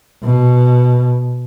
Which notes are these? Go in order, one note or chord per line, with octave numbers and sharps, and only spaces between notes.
B2